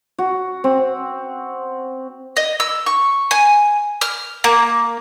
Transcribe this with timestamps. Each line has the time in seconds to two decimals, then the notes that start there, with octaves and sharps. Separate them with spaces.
0.18 F#4
0.64 C4
2.37 D#5
2.60 E6
2.87 C#6
3.31 G#5
4.01 F6
4.44 A#3